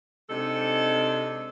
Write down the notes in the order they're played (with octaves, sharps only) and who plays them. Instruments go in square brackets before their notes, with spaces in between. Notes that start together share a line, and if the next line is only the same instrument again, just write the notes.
[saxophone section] C3 G#3 D4 D#4 A4